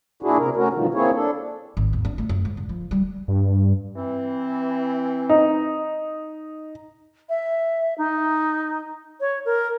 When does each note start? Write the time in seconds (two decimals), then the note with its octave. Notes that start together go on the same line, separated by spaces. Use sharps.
0.23 A#2 D4 E4 F#4 G#4
0.38 C3 A#4
0.56 A3 C#4 F#4 A#4
0.73 G2 B2 D3 D#3 F3
0.94 A#3 C4 E4 G#4 C#5
1.14 D4 A4
1.77 G#1
1.93 E2
2.05 D4
2.18 A3
2.29 F#2
2.45 G#2
2.57 D3
2.69 F3
2.91 G3
3.28 G2
3.96 E3 C4
5.29 D#4
7.29 E5
7.98 D#4
9.21 C#5
9.45 A#4